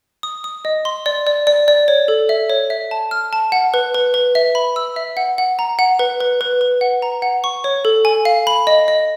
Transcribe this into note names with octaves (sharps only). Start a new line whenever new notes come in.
D#6
D#6
D#5
C6
D5
D5
D5
D5
C#5
A4
E5
C#5
E5
A5
F6
A5
F#5
B4
B4
B4
E5
B5
E6
E5
F#5
F#5
A#5
F#5
B4
B4
B4
B4
F#5
A#5
F#5
C#6
C#5
A4
G#5
F5
B5
D#5
D#5